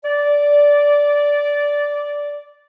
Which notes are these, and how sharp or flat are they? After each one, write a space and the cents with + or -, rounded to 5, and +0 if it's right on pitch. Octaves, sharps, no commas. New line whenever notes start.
D5 -10